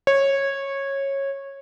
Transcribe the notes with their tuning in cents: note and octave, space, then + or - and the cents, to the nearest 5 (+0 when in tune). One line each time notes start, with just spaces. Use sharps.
C#5 -15